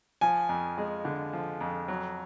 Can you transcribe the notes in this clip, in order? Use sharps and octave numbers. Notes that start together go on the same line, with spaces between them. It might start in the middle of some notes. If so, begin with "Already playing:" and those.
F3 G#5
F2
G#3
D3
F3
F2
F#3